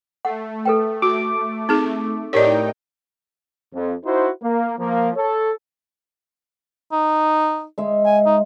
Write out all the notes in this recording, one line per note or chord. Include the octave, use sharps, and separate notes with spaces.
A3 F#5
A4 B4 G5
F#4 D6
C4 D#4 G#4
A2 D#4 G4 A#4 C#5 D5 G5
F2
D#4 E4 F#4 C5
A#3
F3 A#3
A4 C#5
D#4
G#3 E5
G#5
D#4